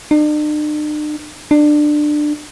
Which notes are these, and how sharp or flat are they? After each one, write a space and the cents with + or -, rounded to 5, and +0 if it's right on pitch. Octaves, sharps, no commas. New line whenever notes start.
D4 +45
D4 +20